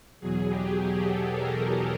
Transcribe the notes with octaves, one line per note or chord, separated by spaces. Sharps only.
E2 B2 F#3 G#4
G4
G#4
A4
A#4